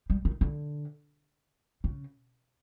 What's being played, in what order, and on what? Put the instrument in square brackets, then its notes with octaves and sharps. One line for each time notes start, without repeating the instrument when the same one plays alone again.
[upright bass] G3
D#3
D3
C#3